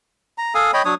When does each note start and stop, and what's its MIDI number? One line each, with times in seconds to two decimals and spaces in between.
0.38 0.54 82
0.55 0.71 69
0.55 0.71 77
0.55 0.71 80
0.55 0.71 87
0.73 0.82 73
0.73 0.82 75
0.73 0.82 79
0.73 0.82 83
0.85 0.95 54
0.85 0.95 62
0.85 0.95 73
0.85 0.95 87